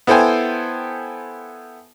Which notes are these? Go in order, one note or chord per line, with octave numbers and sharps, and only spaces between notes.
B3 E4 A4 C5 G5 G#5